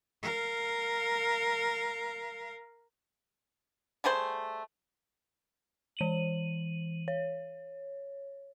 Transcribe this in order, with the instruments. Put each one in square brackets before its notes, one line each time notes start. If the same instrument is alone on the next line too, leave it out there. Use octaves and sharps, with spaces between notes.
[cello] A#4 F5
[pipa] G3 A3 G#4 C5
[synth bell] E3 D#7 F#7
C#5